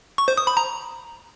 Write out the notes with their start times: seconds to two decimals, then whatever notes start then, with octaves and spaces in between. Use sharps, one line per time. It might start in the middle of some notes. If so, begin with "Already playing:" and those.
0.18 C#6
0.28 C5
0.37 D#6
0.47 B5
0.57 A#5